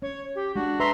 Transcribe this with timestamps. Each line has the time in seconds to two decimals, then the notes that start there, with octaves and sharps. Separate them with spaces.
0.02 C#4 C#5
0.35 G4
0.56 G#3 D4 F#4
0.80 B4 E5 A#5 C6